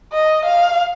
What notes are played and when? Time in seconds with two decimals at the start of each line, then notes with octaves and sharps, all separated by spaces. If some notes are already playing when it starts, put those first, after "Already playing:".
0.13 D#5
0.45 F5